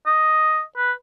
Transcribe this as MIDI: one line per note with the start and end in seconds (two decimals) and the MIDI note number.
0.07 0.61 75
0.77 0.92 71